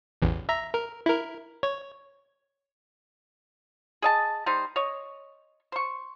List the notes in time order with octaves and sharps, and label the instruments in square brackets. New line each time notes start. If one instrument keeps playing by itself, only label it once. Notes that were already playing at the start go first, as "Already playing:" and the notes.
[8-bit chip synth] A1 E2
E5 A#5
A#4
E4 A#4
C#5
[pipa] G#4 D#5 A5
G3 D#4 C5
C#5 D#5
C5 C#6